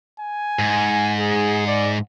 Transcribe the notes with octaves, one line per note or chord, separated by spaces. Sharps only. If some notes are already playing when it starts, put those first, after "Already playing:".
G#5
G#2
G#4
D5